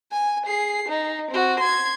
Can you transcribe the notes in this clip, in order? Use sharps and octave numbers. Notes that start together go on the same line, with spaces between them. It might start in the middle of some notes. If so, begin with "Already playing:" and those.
G#5
G#4 C7
D#4
C4 F#4
C6 G#6